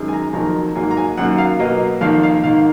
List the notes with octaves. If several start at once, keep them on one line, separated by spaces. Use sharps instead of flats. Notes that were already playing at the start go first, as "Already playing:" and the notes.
Already playing: F#2 D#3 G#3
G#5
A#5
F2 D#3 F#3 A#3 A#5
G#2 F#3 A#3 G#5
A#5
G#5
F#2 D#3 F#3 A#3 F#5
F5
B2 F#3 A#3 D#5
F2 D#3 A#3 F5
F5
G#2 D#3 A#3 F5